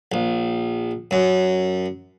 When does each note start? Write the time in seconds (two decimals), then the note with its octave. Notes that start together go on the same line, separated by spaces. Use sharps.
0.12 A#1
1.11 F#2